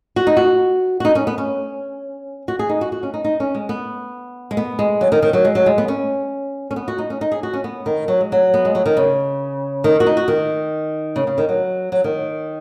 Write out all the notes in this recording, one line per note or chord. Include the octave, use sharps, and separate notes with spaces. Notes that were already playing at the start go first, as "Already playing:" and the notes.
F#4
D#4
F#4
F#4
D#4
C#4
B3
C#4
F#4
G#4
D#4
F#4
F#4
C#4
D#4
D#4
C#4
G#3
B3
G#3
B3
G#3
F#3
D#3
D#3
F#3
G#3
F#3
G#3
B3
C#4
C#4
B3
F#4
D#4
C#4
D#4
G#4
F#4
C#4
B3
D#3
F#3
G#3
F#3
B3
G#3
F#3
D#3
C#3
D#3
F#4
D#4
F#4
D#3
C#3
C#3
D#3
F#3
F#3
D#3